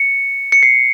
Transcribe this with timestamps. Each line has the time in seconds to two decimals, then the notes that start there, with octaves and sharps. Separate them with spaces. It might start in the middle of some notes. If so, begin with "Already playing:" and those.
Already playing: C#7
0.52 C#7
0.63 C7